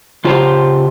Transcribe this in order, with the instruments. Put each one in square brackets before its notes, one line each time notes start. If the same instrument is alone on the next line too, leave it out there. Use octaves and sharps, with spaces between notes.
[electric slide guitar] C#3 F4 G4 C5 A5 A#5